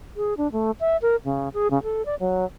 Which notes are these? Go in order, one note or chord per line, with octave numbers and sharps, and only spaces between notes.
G#4
D4
A3
E5
A#4
C#3
G#4
C#3
A4
D5
F#3